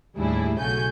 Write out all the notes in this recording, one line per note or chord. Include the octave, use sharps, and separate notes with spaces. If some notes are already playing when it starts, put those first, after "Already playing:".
D#2 A2 G3 D4 E4 G#4
B1 C#3 A3 F#4 G#5 G6